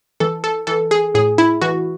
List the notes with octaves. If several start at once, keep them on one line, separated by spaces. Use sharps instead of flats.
E3 A4
A4
E3 A4
G#4
A2 G#4
E4
E3 F#4